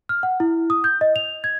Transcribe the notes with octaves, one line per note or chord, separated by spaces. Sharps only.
F6
F#5
E4
D#6
G6
D#5
F7
G#6